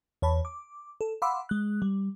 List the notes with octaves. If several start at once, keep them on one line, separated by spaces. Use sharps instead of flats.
E2 C#5 A5 B5
D6
A4
F5 F#5 B5 C6 D6 E6
G#3 F#6
G3